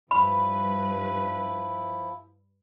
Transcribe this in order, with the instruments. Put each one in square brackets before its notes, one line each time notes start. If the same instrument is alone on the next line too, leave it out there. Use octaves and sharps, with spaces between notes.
[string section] G2 B4 [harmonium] F3 E4 [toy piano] B5